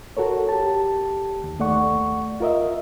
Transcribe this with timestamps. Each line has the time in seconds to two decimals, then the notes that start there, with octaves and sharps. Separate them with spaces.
0.17 F#4 A4 A#4 C#5
0.49 G4 A5
1.44 D#2
1.59 D#2 A3 D5 F#5 C#6
2.40 F4 A#4 D#5 E5